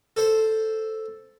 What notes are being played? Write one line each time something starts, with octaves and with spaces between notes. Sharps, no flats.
A4 C5 C6